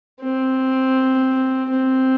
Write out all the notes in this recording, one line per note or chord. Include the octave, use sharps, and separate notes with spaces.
C4
C4